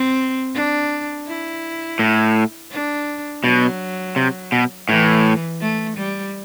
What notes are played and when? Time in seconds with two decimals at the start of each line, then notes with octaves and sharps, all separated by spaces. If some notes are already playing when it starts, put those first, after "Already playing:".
Already playing: C4
0.54 D4
1.27 E4
1.99 A2
2.71 D4
3.43 B2 F#3
4.16 C3
4.52 B2
4.88 A2 E3
5.61 A3
5.97 G3